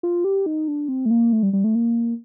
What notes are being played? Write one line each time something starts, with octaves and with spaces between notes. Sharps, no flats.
F4
G4
D#4
D4
C4
A3
A#3
A3
G3
G3
A3
A#3